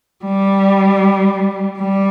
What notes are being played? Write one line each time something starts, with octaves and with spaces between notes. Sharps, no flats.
G3
G3